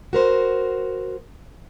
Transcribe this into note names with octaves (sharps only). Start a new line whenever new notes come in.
F#4 A#4 C5